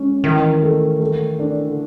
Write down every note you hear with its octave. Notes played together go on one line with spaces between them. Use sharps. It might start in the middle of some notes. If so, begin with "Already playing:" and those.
Already playing: G#3 C#4
D#3 E3
A3
A3
D4
D3